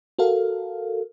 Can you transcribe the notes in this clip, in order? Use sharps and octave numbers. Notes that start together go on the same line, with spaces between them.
F#4 A4 A#4 F5